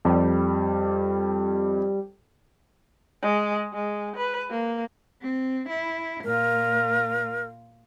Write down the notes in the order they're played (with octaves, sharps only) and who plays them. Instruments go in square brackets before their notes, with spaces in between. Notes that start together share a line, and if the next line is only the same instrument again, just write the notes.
[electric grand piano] F2 [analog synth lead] G3
[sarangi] G#3
G#3
B4
A#3
[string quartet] C4
E4
[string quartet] A#2 F4 [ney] A#4